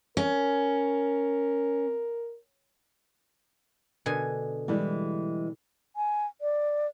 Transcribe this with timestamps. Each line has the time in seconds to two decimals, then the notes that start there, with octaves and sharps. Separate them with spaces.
0.17 C#4 A#4
4.06 B2 D3 G#5
4.68 E3 G3 G#3
5.96 G#5
6.41 D5